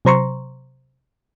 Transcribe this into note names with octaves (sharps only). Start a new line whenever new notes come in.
C3 F#3 C5 A#5 C6 C#6